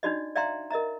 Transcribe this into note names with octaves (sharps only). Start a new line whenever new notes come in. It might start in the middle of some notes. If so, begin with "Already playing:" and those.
D4 D#4 F4 F#4 D5 D#5
D5 E5 F5 G5 A#5 C6
A#4 D#5 E5 A#5